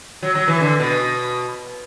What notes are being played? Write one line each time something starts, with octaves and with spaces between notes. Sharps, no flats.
F#3
F#3
E3
D3
B2